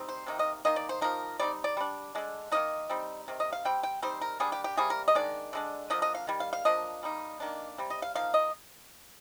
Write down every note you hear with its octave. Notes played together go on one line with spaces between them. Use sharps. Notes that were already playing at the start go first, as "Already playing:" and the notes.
Already playing: G3 C4 D#4
C5
C3 D#3 A#3 D#4
D#5
D#3 A#3 D#4 D#5
D5
C5
F3 A#3 D#4 A#4
G3 C4 D#4 D5
D5
G3 D4
D3 G#3 D4
D#3 A#3 D#4 D#5
G3 C4 D#4
C3 D#3
D#5
F5
G3 C4 G5
G5
G3 C4 D#4 C5
A#4
G3 A#3 D4 G#4
G4
G4
C3 G3 A#3 G#4
A#4
D#5
D#3 G#3 D4 D5
D3 G#3 D4
D3 F3 A#3 D#5
D#5
F5
D#3 G3
F5
F5
F3 A#3 D4 D#5
G3 A#3 D#4
D#3 A#3 D4
C3 G3
D#5
F5
F3 A#3 D#4 F5
D#5